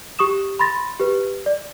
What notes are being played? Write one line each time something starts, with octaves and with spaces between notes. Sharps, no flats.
G4 C#6 D#6 E7
B5 C6 A6 A#6
G4 B4
D5